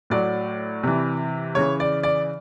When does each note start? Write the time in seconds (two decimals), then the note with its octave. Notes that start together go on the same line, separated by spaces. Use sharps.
0.10 A2 F#3 D5
0.83 C3 E3
1.55 C#3 E3 C#5
1.80 D5
2.03 D5